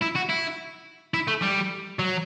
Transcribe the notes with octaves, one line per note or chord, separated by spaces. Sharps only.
E4
F#4
E4
E4
A3
G3
F#3